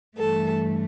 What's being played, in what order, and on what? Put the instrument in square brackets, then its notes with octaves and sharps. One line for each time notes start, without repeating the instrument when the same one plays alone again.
[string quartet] G2 E3 A3 A4